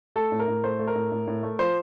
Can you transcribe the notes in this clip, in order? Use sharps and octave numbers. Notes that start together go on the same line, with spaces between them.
A3 A4
A2
A#4
A2
A3 C5
A3
A#4
A2
A2
A2
A3
F3 C5